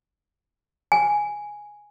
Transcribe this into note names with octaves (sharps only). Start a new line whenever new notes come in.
G#5